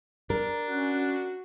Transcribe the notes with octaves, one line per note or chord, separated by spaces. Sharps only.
D4 A#4
C#4 F#4 F#6